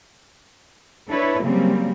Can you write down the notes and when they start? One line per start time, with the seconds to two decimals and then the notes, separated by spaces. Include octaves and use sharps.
1.09 D4 E4 A4 B4 C#5
1.43 C#3 F#3 G3 A#3 C4